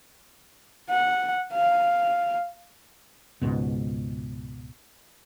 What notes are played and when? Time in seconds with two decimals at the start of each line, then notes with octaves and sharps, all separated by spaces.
0.90 F#5
1.53 F5
3.42 C#2 G#2 B2